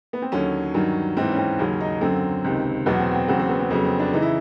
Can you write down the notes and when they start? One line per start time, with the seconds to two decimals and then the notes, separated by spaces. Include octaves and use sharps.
0.13 B3
0.22 C4
0.32 D#2 D3 F#3 C#4
0.74 G2 D#3 F#3
1.17 G#2 E3 C4
1.31 C#4
1.38 C4
1.59 D#2 C#3 F#3 C#4
1.80 D#4
2.01 F#2 D3 F#3 C4
2.44 C#2 C3 D#3
2.86 E2 B2 F#3 B3
3.00 C4
3.14 C4
3.28 E2 C#3 F#3 C4
3.39 C4
3.49 B3
3.60 C4
3.70 F2 C#3 F#3 B3
3.85 C4
3.99 D4
4.13 C#3 E3 D#4
4.22 E4